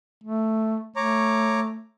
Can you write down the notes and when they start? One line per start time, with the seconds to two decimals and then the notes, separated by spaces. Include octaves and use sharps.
0.24 A3
0.96 A3 C#5 A#5 D6